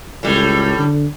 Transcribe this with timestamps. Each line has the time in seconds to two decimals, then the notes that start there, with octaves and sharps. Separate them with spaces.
0.23 C#2 A2 G3
0.79 D3